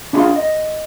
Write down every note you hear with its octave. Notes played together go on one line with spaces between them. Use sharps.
D4 E4 F4 G#4 F5 C6
D#5